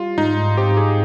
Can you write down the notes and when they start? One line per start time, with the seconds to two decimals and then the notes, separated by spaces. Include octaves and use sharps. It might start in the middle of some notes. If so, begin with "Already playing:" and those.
Already playing: G3 F4
0.18 G#2 D#4
0.57 C4 G4
0.77 G#4